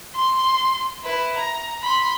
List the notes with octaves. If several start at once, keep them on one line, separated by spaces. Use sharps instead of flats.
C6
E4 B4
A#5
B5 C6